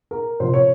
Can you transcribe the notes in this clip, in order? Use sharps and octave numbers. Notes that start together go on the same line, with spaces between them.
A#4
C3 F3 C5
C#5